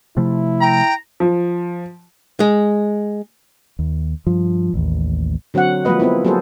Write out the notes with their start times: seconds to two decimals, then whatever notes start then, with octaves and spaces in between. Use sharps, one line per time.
0.17 C3 F3 A3 E4
0.61 G5 A#5
1.20 F3
2.40 G#3
3.79 D#2
4.27 G2 F3
4.74 A1 D#2
5.54 D3 F#3 C4 F#4 F#5
5.85 F3 G3 G#3 A#3 B4 D#5
6.00 B3 C4 E4
6.25 F#3 A#3 G#4 A4 B4 C5